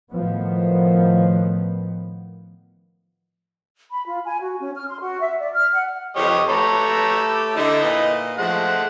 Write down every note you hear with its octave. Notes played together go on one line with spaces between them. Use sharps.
A2 D#3 F3 B3
B5
F4
G#5
F#4
C#4
F6
C6
F#4
E5
D5
F6
F#5
F2 G4 C#5 D#5
A3 G4 A4 B4 C#5 A#5
D3 D#4 E4
A#2 B3 D#5
F3 G#3 A3 F#5